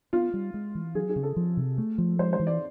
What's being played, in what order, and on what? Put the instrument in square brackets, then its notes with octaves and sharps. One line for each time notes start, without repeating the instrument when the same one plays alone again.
[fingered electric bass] B3 [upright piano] F4
[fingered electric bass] G3
G#3
E3
[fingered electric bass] F#3 [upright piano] G#4
[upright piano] G#4
[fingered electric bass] C#3
[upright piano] A4
[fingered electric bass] F3
C3
A3
F3
[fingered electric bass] G#3 [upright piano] C5
[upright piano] C5
[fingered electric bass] E3
[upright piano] D5